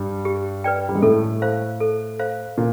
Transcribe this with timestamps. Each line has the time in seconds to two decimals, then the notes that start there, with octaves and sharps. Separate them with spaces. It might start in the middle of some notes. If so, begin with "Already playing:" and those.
Already playing: G2 G3
0.25 G4
0.64 B4 D5 G5
0.89 G3
0.95 G#3
1.02 A2 A3 A4
1.42 C5 F5
1.80 A4
2.19 C5 F5
2.58 A#2